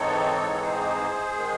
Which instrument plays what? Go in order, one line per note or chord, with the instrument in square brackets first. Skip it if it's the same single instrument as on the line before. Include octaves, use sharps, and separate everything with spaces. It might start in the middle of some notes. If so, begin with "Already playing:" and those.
Already playing: [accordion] G#2 E3 C4 D#4 A4 C#5
A4
G#4 C5
D#3 G#3